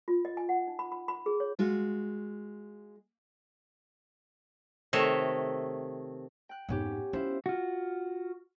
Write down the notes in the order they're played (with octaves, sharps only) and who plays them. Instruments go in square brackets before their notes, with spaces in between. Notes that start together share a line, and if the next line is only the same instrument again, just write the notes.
[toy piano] F4
D#5
G#5
F#5
D#4
B5
B5
B5
G#4
C#5
[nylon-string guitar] G#3 F4 F#4
[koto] C3 D#3 A3 C#5 D#5 E5
[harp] G5 F#6
[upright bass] F2 G#2 [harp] B3 C#4 G4
[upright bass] C#4 [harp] E4 F4 C5
[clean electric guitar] F4 F#4